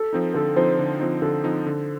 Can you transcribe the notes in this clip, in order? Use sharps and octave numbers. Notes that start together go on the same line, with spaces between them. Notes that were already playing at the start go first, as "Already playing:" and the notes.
Already playing: A4
F3 C4 D#4
D3 A4
F3 C4 D#4 C5
D3
F3 C4 D#4
D3 A4
F3 C4 D#4
D3